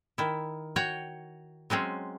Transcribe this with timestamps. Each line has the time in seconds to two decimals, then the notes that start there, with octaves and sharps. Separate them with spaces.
0.18 D#3 E4
0.76 F#4 C#5 F#5 G5
1.70 F#3 G#3 C4 C#4